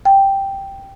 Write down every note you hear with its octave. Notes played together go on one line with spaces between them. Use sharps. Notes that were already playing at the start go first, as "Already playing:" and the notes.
G5